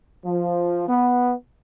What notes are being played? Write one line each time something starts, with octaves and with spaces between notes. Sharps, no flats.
F3
B3